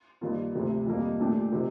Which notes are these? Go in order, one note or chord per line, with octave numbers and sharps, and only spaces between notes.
G2 D#3 A#3 F4
D2 C3 F3
F2 D#3 G3 A#3 D#4
A#2 A3 D4 G4
C3 D#3